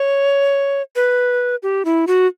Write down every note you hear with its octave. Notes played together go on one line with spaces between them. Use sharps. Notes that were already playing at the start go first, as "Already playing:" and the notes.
Already playing: C#5
B4
G4
E4
F#4